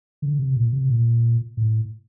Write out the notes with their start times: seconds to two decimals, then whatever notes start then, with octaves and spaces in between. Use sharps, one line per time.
0.22 D3
0.39 C3
0.56 A#2
0.73 C3
0.89 A#2
1.57 A2